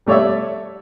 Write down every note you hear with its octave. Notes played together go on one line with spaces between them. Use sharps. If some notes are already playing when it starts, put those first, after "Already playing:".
G3 A3 C#5 D5 E5